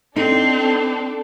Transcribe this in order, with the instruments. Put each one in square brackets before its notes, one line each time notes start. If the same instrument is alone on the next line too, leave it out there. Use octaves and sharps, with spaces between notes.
[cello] C4 [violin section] D4 A4 [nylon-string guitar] D#4